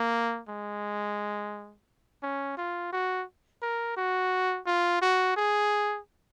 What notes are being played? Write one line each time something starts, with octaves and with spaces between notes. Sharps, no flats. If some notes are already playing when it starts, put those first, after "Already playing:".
Already playing: A#3
G#3
C#4
F4
F#4
A#4
F#4
F4
F#4
G#4